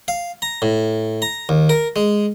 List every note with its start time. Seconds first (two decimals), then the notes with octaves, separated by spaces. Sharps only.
0.08 F5
0.42 A#5
0.62 A2
1.22 A#5
1.49 D#2
1.69 A#4
1.96 G#3